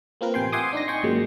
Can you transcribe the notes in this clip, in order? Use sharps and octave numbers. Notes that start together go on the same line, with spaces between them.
A#3 C4 F4 A#4 B4
A1 C3 G5 G#5 C6
E5 F#5 G#5 C6 D6 D#6
D4 D#4 C6 A#6
D#4 G5 G#5 C6 C#6
G#1 A#2 C#3 F#3 G#3 A#3